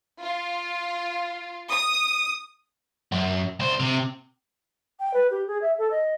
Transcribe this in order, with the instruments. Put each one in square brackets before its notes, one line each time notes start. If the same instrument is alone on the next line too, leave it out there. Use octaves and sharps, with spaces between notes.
[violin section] F4
D#6
[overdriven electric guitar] F#2
C2 C5
C3
[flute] G5
B4
G4
G#4
E5
A4
D#5